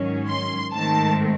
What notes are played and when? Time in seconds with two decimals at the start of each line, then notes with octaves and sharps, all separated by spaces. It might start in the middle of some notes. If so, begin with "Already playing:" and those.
Already playing: G#2 D#3 F#3 C#4
0.27 C6
0.74 G#2 D#3 A3 C4 A5